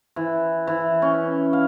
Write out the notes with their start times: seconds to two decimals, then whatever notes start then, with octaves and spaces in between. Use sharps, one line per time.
0.16 E3
0.67 E3
1.02 C#4
1.53 F5